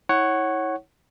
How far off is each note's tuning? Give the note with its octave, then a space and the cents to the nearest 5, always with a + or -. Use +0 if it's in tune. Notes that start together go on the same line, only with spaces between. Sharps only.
E4 -35 C#5 -10 F#5 +10